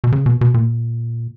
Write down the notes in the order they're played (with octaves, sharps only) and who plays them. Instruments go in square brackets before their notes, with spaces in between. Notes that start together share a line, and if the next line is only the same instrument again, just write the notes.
[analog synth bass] B2
C#3
B2
B2
A#2